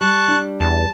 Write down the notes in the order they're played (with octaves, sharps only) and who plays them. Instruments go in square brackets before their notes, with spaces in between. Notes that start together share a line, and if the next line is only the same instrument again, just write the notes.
[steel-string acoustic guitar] G3 [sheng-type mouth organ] A5 C#6 F#6
[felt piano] D4
[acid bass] E2 [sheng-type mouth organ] A5